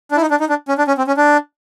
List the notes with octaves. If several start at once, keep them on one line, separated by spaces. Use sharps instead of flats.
D4
E4
D#4
D4
D#4
D4
C#4
D4
C#4
C4
C#4
D4